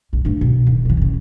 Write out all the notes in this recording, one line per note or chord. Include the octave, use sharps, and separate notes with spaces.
A#1
G2 A3
B2
D1 D#3
C3 E3
E1 C#3